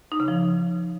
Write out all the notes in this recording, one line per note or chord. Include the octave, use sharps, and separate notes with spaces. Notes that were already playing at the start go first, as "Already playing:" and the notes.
D#4
C#3
F3